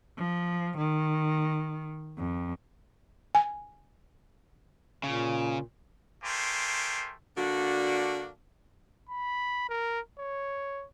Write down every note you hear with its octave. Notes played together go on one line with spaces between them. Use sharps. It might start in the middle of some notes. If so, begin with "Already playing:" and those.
F3
D#3
F2
G#5
A#2 C#3
A3 G4 A#4 C5 G#5 C6
D3 A#3 D4 F#4
B5
A#4
C#5